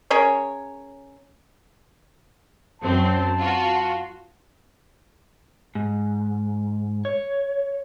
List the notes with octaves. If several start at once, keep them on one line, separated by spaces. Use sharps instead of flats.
C#4 G#4 A#4 C#5
F#2 C4 A5
F4 F#4
G#2
C#5